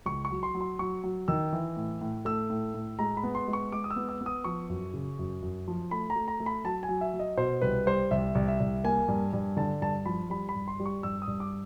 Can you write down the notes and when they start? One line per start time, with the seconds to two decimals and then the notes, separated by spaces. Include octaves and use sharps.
0.06 C#2 C#6
0.25 C#6
0.31 F#3
0.43 C6
0.55 F#3
0.61 C6
0.79 F#3 C#6
1.04 F#3
1.28 D#3 E6
1.53 E3
1.77 A2
2.01 A2
2.25 A3 E6
2.50 A2
2.74 A2
2.99 G#3 A#5
3.17 B5
3.23 B3
3.35 C6
3.48 G#3
3.53 C#6
3.72 G#3 D6
3.84 D#6
3.90 E6
3.96 B3
4.09 E6
4.21 B3
4.26 D#6
4.44 F3 C#6
4.69 F#2
4.94 C#3
5.19 F#2
5.42 F#2
5.68 F3
5.91 A3 B5
6.10 A#5
6.16 A3
6.28 A#5
6.40 A3
6.46 B5
6.64 F#3 A5
6.83 G#5
6.89 F#3
7.01 E5
7.14 F#3
7.20 D#5
7.37 B2 C5
7.62 C2 B4
7.86 G3 C5
8.11 C2 E5
8.35 C2
8.48 E5
8.60 C2
8.84 A#3 G#5
9.08 G2
9.33 G2
9.57 D3 A5
9.81 G2 A5
10.05 F3 B5
10.30 G3 B5
10.49 B5
10.55 G2
10.68 C6
10.80 G3
10.86 C#6
11.03 G2 E6
11.22 D#6
11.27 G2
11.40 D6